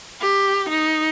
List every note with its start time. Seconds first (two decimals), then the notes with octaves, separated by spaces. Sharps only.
0.21 G4
0.69 D#4